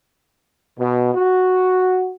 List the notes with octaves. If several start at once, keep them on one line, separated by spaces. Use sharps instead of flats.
B2
F#4